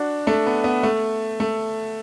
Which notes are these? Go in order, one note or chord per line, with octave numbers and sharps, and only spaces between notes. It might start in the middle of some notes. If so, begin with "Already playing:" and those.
Already playing: D4 F#4
A3 D4
B3
B3
A3
A3